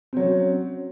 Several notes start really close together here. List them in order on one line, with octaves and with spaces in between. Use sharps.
C4 F#3 C#4